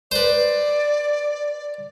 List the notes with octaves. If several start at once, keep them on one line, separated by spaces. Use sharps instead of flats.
B4 C5 D5